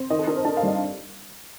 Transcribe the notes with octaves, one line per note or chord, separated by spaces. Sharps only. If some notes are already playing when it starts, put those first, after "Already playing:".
Already playing: C4
D#3 D#5
A4
D4 A#4
C5
D4 A5
F5
G3 D#5